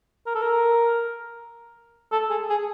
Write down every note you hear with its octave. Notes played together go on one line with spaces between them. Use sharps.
A#4
A4
A#4
A4
G#4
G#4